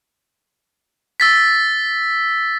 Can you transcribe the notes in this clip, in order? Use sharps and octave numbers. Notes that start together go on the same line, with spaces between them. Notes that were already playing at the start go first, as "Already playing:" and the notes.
E6 A6 B6